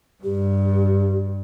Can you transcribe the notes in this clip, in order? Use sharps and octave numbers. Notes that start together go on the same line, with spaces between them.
G2 G4